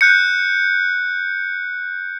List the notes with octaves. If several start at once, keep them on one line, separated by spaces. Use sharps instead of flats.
F#6 G6 C#7